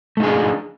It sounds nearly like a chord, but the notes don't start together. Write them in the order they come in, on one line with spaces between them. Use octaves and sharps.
A3 D#4 G#4 D4